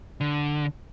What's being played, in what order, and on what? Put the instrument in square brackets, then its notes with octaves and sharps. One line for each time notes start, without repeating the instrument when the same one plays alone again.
[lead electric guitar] D3